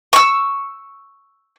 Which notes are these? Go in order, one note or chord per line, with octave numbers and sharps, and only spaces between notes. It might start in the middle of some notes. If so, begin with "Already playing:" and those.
C#6 E6